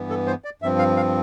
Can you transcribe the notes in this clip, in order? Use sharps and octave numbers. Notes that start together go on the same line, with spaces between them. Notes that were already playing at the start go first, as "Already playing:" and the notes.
Already playing: G2 E3 B3
A4
C5
D5
G2 F3 C4 E5
F5
F5